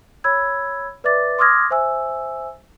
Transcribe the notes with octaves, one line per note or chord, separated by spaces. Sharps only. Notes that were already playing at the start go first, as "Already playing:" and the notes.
C#5 B5 E6 G#6
B4 D5 E5 D6 A6
C6 D6 D#6 F6 G#6 A#6
C5 E5 G#5 E6